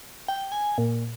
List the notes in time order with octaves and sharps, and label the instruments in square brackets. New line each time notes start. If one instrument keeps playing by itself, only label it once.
[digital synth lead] G5
G#5
A#2